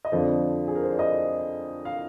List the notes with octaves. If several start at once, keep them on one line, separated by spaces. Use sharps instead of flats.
D#5
F2 D3 F3 D5
G#4
A#4
C5
D5
D#5
F5